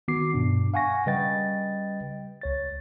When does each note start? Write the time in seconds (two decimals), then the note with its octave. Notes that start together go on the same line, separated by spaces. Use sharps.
0.08 D#3 B3 F#4 D6 C7
0.34 G2 B2 D4
0.74 F5 F#5 G#5 C#6 A#6
1.06 C#3 G3 B4 D#5 G5 A6
2.42 C#2 C#5 A6